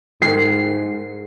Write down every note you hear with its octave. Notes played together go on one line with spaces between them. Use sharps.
G#2 C7